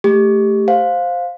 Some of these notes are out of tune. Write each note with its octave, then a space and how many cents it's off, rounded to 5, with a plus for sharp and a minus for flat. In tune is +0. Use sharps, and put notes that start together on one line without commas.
A3 +0 G4 +10
C5 +0 F5 +10